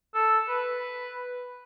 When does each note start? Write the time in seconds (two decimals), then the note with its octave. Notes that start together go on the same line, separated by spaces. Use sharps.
0.15 A4
0.49 B4